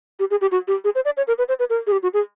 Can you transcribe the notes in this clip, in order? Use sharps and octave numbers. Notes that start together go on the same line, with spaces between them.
G4
G#4
G4
F#4
G4
G#4
C5
D5
C#5
A#4
B4
C5
B4
A#4
G#4
G4
F#4
G#4